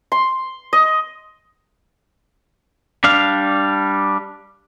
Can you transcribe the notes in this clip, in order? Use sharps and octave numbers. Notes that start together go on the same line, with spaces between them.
C6
D#5
G3 D4 F5